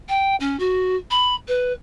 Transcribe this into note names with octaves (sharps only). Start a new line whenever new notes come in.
G5
C#4
F#4
B5
B4